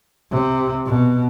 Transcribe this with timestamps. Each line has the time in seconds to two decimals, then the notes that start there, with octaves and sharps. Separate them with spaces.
0.31 C3
0.86 B2